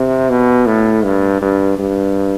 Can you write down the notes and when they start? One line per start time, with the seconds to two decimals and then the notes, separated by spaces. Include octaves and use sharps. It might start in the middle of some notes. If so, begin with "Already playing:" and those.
Already playing: C3
0.30 B2
0.66 A2
1.04 G2
1.42 G2
1.79 G2